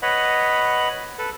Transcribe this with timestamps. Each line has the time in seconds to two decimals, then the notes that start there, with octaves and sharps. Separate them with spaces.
0.02 B4 C#5 D#5 F#5 B5
1.18 A4 B4